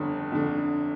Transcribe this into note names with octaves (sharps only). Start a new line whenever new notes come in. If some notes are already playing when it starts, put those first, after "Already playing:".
Already playing: G1 F2 D3
F2 D3